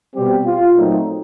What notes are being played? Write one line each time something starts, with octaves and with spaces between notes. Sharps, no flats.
B2 G3 C4 G4
F4
A#2 F#3 A3 C4 D#4